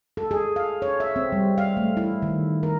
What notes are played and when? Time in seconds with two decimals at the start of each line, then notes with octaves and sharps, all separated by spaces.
0.17 A4
0.31 G#4
0.56 F5
0.82 C#5
1.00 E5
1.16 C4
1.32 G3
1.58 F5
1.77 A3
1.97 E4
2.23 D#3
2.63 A#4